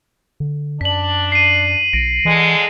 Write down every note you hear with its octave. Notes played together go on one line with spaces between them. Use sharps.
D3
F#2 D4 B6 F#7
C7 D#7
B1 A#6 D7
E2 D3 E3 G#3